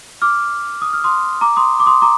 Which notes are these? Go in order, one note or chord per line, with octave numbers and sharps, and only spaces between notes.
D6 F6
D#6
F6
C6 D#6
A#5 D6
C6 D#6
D6
C6 D#6
A#5 D6